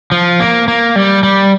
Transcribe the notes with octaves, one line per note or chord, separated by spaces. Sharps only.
F3
A#3
A#3
G3
G3